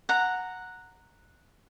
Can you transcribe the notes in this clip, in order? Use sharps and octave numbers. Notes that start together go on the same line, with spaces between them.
F#5 A#5